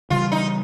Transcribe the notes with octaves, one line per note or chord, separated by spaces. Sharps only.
C#3 E3 G3 F4
D#4